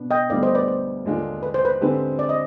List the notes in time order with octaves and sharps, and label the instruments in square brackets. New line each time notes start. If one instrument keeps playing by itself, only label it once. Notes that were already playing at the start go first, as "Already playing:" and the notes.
Already playing: [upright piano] B2 B3 D4
[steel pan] D#5 G5
[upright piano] D2 D3 G3 B3 [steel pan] D5 F5
[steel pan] C5 D#5
B4 D5
C5
[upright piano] D#2 D3 G#3 D4 F4
[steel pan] B4
C5
B4
[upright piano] D3 G#3 C4 G4 B4
[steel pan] D5
D#5